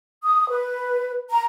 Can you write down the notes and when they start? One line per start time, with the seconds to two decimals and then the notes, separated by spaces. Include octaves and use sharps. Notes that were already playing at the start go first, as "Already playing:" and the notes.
0.23 D#6
0.50 B4
1.30 A#5